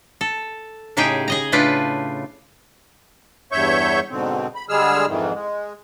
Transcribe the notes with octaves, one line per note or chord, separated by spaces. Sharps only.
A4
A2 C#3 D#4 G4 G#4 G5
G#4 D#5 A#5
A2 C#3 A3 D4 F4 B4
E2 G2 C#5 E5 C#6 G6
G#2 B2 D3 C4
B5
D3 G3 G#3 G#4 E6 F6
F2 G#2 D#3 E3
G#3